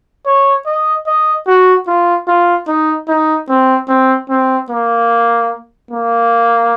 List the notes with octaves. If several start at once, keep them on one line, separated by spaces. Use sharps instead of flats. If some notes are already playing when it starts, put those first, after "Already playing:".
C#5
D#5
D#5
F#4
F4
F4
D#4
D#4
C4
C4
C4
A#3
A#3